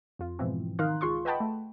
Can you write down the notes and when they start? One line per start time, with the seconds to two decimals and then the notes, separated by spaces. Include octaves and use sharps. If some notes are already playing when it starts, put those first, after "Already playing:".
0.19 F2 F4
0.39 G#2 B2 E3 F3 C4
0.79 D#3 D#4 A#4 F5 C6 F#6
1.01 C#2 F4 G#4 C6 C#6
1.25 B4 D#5 F#5 G5 A5 B5
1.40 A3